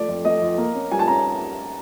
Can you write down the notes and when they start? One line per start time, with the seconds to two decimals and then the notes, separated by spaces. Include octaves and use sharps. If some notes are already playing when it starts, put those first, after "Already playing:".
Already playing: F3 A3 D5
0.08 F2
0.25 A3 D#5
0.42 F2
0.58 A#3
0.75 C#4
0.91 G3 G#5
0.99 A5
1.08 C#4 A#5